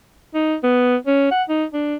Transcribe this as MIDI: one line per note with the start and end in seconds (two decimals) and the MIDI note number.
0.34 0.55 63
0.63 0.96 59
1.07 1.31 61
1.31 1.43 78
1.49 1.65 63
1.74 1.96 62